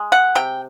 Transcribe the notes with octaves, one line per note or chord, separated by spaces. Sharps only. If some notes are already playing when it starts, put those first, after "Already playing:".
Already playing: G#3
F#5
C3 G5